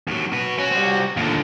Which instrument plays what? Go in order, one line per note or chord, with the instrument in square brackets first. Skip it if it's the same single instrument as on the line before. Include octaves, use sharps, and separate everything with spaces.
[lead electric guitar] D#2 F#3
F#4 B4
[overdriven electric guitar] C#4 [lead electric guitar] F#4
[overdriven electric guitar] G3 C4
[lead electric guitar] D#2 [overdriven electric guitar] A#2 D3